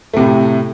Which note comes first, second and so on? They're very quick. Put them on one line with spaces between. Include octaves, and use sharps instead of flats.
A3 C3 A2